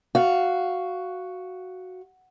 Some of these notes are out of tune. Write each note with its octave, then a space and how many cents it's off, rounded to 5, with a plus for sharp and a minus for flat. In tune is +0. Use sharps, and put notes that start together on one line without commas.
F#4 +0 F5 -5